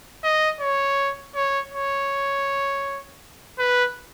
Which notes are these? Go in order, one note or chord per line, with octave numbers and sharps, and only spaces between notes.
D#5
C#5
C#5
C#5
B4